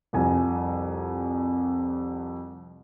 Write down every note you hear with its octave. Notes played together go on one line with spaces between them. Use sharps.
C2 F2 G#5